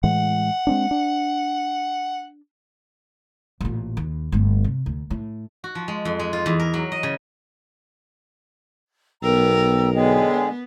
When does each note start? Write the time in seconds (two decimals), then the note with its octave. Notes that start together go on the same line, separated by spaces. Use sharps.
0.04 A2 E3 G#3 F#5
0.67 G#3 C4 D4
0.91 D4
3.61 A1 A#2
3.97 D#2
4.32 G1 A3
4.64 C3
4.86 D2
5.10 A2
5.64 F#4
5.75 F3
5.88 G#3
6.05 F2
6.19 G#3
6.33 F4
6.46 E2
6.60 A#4
6.74 F#3
6.92 D#5
7.03 C#3
9.23 B1 B3 A#4 G5 A#5 E6
9.94 D3 G#3 B3 G#4 C#5 D#5 G5